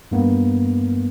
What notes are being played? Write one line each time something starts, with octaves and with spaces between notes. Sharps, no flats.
G2 A#3 B3